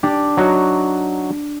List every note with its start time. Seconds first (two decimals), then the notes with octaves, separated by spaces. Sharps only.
0.03 D4 G4
0.37 F#3 D#4 F#4